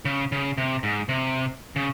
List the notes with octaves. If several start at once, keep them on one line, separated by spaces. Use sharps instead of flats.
C#3
C#3
C3
G#2
C3
C#3